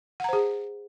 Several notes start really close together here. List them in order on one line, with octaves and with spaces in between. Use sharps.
F#5 A#5 C5 G#4